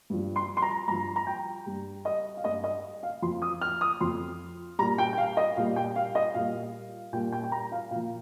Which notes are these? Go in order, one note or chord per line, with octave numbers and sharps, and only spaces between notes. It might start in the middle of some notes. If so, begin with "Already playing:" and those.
G2 F3
C6
C6
A#5
G2 F3 A#5
A#5
G5
G2 G3
D#5
F5
G2 G3 D#5
D#5
F5
F2 F3 C6
D#6
F6
D#6
F2 F3 C6
A#2 G3 A#5
G5
G5
F5
D#5
A#2 G3 F5
G5
F5
D#5
A#2 G3 F5
A#2 G3 G5
G5
G5
A#5
F5
A#2 F3 F5